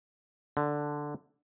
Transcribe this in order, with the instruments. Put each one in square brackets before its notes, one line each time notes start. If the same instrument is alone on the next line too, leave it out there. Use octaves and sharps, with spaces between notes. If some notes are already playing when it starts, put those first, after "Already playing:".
[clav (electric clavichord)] D3